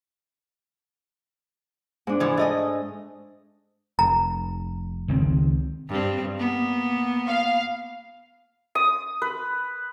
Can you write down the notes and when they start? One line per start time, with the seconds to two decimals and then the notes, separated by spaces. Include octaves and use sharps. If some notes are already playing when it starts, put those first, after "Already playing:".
2.07 G#2 D4
2.20 E3 F3
2.37 A3 D#5 G#5
3.99 F1 A#5
5.08 C#2 D#3 C4
5.89 G2 C4
6.38 A#3 B3
7.28 F5
8.75 D#6
9.22 B4